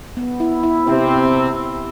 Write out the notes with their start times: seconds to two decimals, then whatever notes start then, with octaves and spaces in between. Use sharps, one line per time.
0.17 B3
0.40 E4
0.63 E4
0.87 C3 C4 E4